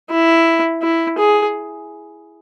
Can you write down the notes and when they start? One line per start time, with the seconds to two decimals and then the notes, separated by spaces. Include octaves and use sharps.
0.11 E4
0.82 E4
1.19 G#4